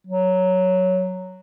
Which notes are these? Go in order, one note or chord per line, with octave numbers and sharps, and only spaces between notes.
F#3